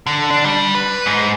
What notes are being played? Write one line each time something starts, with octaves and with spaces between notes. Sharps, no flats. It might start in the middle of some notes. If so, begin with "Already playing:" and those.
D3
D4
G3
B4
G#2